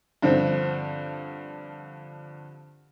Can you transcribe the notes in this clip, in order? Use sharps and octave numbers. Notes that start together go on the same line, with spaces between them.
G2 D3 F3 C4